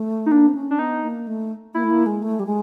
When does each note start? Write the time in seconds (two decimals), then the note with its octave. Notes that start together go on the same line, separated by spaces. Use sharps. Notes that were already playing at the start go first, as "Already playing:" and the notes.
Already playing: A3
0.26 D#4
0.32 A#3 D4
0.48 C4
0.54 C#4
0.71 D4
0.79 B3 D#4
1.03 A#3
1.27 A3
1.75 A#3 E4
1.84 A3
1.91 A#3
2.06 G#3
2.23 A3
2.40 G3
2.46 G#3